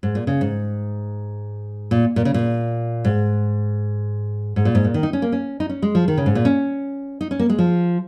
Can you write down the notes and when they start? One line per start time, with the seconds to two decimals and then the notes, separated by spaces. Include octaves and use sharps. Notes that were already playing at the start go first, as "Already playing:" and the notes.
0.03 G#2
0.15 A#2
0.27 C#3
0.41 G#2
1.91 A#2
2.16 A#2
2.25 C#3
2.34 A#2
3.05 G#2
4.56 G#2
4.65 A#2
4.75 G#2
4.84 A#2
4.94 D#3
5.03 D#4
5.13 C#4
5.22 A#3
5.32 C#4
5.60 D#4
5.69 C#4
5.82 G#3
5.95 F3
6.08 D#3
6.17 C#3
6.26 G#2
6.35 A#2
6.45 C#4
7.21 D#4
7.31 C#4
7.39 A#3
7.49 G#3
7.59 F3